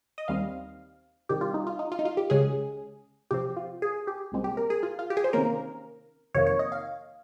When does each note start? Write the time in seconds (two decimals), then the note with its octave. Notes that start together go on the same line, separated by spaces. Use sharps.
0.18 D#5
0.28 D#2 D#3 G3 C4 F5
1.29 C3 D#3 G3 G4
1.41 F4
1.54 D#4
1.67 F4
1.79 D#4
1.92 F4
1.99 D#4
2.05 F4
2.17 G4
2.30 C#2 C#3 G#3 C#4 G#4
3.31 C3 F3 C4 G4
3.57 F4
3.82 G#4
4.07 G4
4.32 C2 A#2 G#3 C4
4.44 G4
4.57 A#4
4.70 G#4
4.83 F4
4.99 F4
5.10 G4
5.17 G#4
5.24 C5
5.33 C3 D#3 A#3 C#4 A#4
6.34 F2 C3 D#3 A#3 C#5
6.47 C#5
6.59 D#5
6.72 F5